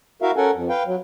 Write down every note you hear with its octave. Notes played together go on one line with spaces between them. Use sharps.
E4 F#4 A#4 E5 F5
C#4 A4 A#4 F#5 G#5
F2
B4 F5 G5
F#3